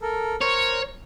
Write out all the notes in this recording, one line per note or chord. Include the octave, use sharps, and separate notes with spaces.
A4 A#4
A#4 C5 C#5